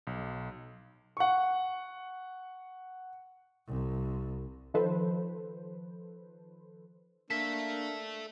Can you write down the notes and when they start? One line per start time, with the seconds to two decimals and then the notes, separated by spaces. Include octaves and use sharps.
0.07 B1
1.17 F#5 C#6
3.67 C2
4.74 D#3 F3 A4 B4 C5
7.31 A#3 D4 A4 E5 B6